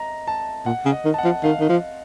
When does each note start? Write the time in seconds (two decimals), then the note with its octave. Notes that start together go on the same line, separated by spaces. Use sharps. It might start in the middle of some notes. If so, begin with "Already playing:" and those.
Already playing: D#5 A#5
0.27 A5
0.66 A#2 F#5
0.85 C#3
0.92 D#5
1.05 D#3
1.14 A5
1.18 F#5
1.24 F3
1.44 D#3 F5
1.60 D#3
1.69 F3